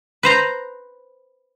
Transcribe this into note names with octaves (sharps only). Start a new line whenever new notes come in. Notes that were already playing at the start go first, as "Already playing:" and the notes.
B4 C5 A#5